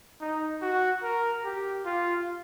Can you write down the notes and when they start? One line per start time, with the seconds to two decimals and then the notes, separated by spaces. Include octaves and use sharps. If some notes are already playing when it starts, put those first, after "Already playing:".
0.21 D#4
0.61 F#4
1.03 A#4
1.45 G4
1.85 F4